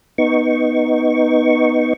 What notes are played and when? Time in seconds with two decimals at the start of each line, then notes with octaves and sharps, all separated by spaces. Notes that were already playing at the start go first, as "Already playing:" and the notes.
0.18 B3 D#4 C#6